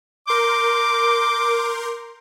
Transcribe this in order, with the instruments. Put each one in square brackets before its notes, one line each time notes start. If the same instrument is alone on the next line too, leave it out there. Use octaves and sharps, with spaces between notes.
[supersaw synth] A#4 C6 G6 [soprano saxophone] D6